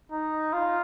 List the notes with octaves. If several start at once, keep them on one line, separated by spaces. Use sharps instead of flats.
D#4
F4